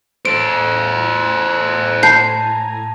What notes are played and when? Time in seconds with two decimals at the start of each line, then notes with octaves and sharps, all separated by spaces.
0.25 A2 A4 C5 G#5 A#5 D7
2.03 A5 B5 G6 C7